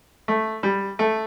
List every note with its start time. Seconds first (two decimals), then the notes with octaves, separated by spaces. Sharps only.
0.28 A3
0.63 G3
0.99 A3